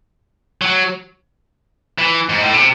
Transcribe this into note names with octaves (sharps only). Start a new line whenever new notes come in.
F#3
E3
G#2
A2
C3